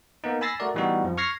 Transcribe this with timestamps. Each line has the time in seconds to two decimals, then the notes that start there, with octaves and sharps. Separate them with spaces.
0.24 A#3 B3 D#4
0.41 G#5 B5 E6 A6 A#6 C7
0.60 A3 F#4 A#4 D5
0.74 A2 E3 G3 B3 D#4 F#4
1.04 F2 F3
1.18 C#6 F6 G#6 A#6 C7